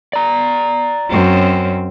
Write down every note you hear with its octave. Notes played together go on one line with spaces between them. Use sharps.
D5 A#5
F#2 C4 C#4